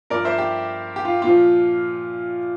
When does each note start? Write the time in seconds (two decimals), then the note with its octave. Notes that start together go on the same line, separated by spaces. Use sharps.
0.10 G2 F3 A#4 D5
0.25 C5 E5
0.38 G4
0.96 G4
1.05 F4
1.22 A#2 F4
1.29 F3